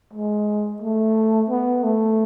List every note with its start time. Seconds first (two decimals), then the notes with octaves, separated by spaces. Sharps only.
0.13 G#3
0.82 A3
1.50 B3
1.84 A3